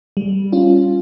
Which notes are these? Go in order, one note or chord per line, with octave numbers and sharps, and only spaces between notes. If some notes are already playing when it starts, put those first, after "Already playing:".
G3
C#4 F4